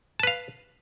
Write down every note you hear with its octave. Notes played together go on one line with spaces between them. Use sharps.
B4 F5 A5